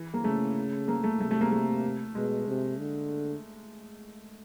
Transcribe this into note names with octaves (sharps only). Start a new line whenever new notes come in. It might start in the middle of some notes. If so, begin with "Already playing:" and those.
Already playing: E3
A#3
C#3 A3
A#3
A3
C3 A3
A3
A#3
A3
B2 G#3
C3
D3